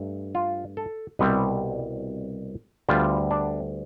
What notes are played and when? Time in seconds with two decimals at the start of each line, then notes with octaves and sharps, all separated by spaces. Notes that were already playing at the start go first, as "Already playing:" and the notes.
Already playing: G2 A3
0.35 F4
0.77 A4
1.19 C2 B2 G3 C4 B4
2.89 D2 D3 G3 B3 F4
3.31 D4